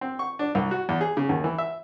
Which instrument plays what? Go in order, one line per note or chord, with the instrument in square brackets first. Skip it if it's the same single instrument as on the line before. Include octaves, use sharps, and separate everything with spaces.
[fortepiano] C4
C#6
D4
C2
F#4
E2
G#4
C#3
D#2
E3
E5